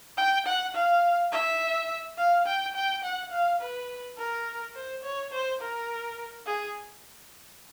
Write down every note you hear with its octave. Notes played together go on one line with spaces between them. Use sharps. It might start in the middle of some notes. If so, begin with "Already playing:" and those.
G5
F#5
F5
E5
F5
G5
G5
F#5
F5
B4
A#4
C5
C#5
C5
A#4
G#4